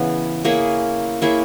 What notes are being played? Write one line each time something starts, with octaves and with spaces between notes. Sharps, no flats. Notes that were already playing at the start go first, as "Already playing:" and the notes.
Already playing: C#3 E3 B3
A#3 E4 G#4 C#5
A#3 E4 G#4 C#5